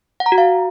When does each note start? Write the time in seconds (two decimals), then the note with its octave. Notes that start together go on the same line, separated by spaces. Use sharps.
0.20 F#5
0.26 A#5
0.32 F#4
0.38 F5